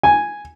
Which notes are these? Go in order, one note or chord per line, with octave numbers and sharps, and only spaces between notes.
G#5